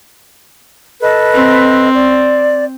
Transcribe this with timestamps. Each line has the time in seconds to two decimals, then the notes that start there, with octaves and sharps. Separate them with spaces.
1.01 A4 B4 D#5
1.34 C4
1.94 D5